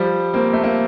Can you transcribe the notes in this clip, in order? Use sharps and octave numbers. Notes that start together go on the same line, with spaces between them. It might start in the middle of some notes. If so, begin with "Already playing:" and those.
Already playing: F3 G3
A#3 C4
A3
A#3